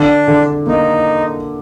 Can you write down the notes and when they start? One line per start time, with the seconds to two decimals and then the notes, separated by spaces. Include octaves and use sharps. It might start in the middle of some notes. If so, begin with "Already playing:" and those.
Already playing: D3 D4
0.28 D3
0.67 A#3 D#4